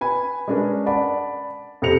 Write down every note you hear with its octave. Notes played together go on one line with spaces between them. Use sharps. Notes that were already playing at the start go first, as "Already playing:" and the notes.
B4 G#5 B5
G#3 C#4 D4 A#4 B4
D5 F#5 A5 B5
F2 C3 C5 A#6 C#7 F7